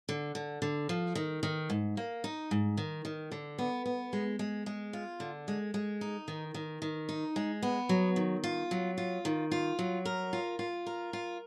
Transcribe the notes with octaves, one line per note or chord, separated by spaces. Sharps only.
D3
D3
D3
F3
D#3
D#3
G#2
A#3
D#4
G#2
D#3
D#3
D3
B3
B3
G#3
G#3
G#3
F4
D3
G#3
G#3
D#4
D#3
D#3
D#3
D#4
G#3
B3
F#3
D#3
F4
F#3
F4
D#3
F4
F#3
A#4
F4
F4
A#4
F4